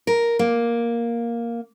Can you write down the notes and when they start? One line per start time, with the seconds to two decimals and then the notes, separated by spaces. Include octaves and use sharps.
0.07 A#4
0.39 A#3